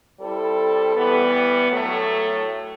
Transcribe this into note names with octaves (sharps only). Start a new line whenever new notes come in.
G3 C4 E4 A4
E3 G3 B3
A2 F#3 A3